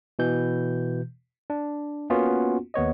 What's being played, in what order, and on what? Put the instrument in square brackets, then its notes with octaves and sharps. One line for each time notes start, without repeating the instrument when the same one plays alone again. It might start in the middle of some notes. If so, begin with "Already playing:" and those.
[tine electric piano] B2 E3 G6
D4
A#3 B3 C#4 F4 F#4
D#2 B3 C#5 D#5